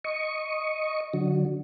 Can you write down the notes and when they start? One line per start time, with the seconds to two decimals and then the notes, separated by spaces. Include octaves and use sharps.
0.04 D#5 C#6
1.14 D3 F#3